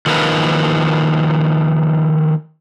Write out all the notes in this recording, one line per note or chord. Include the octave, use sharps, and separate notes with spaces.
D#3 F3 A#3 B4